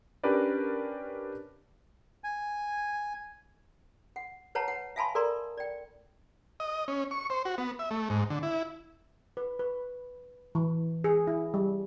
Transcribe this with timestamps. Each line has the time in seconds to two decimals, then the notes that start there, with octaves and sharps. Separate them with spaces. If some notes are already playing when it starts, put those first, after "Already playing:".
0.23 C#4 D4 G4 A#4 B4 D5
2.24 G#5
4.16 F#5
4.55 B4 C#5 F#5 A5 A#5
4.68 F#5
4.96 E5 F5 G#5 A5 B5 C6
5.15 A4 A#4 D5 A#5 C6
5.58 D5 G5
6.60 D#5
6.88 C#4
7.11 C#6
7.30 C5
7.45 F#4
7.58 B3
7.79 E5
7.91 A3
8.10 G#2
8.30 D3
8.43 E4
9.37 B4
9.59 B4
10.55 E3
11.04 G#4
11.27 E4
11.54 G3